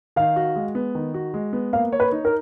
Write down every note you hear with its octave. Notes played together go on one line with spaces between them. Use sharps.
D#3 F5
F#4
G#3
B3
D#3
F#4
G#3
B3
A#3 F5
C#5
B4
D#4
A#4